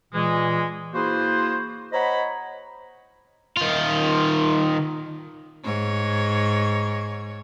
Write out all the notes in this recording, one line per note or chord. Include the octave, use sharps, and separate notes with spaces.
A#2 E3 G#3
A#3 E4 F#4 G#4 B4 C5
C5 C#5 D#5 F#5 A#5 B5
D#3 F4
G#2 C#5